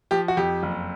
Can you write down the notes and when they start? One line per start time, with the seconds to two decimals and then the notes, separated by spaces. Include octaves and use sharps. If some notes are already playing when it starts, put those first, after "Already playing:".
0.11 F3 G4
0.28 F#4
0.37 F2 G4
0.63 F#1